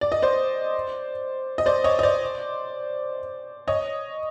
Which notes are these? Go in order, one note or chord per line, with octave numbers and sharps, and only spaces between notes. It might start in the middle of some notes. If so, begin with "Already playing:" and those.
D5
D#5
C5 D5
D#5
C5 D5
C#5 D#5
D#5
C5 D5
C#5 D#5